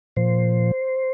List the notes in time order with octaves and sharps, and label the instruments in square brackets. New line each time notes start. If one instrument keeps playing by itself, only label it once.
[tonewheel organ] A#2 F3 C5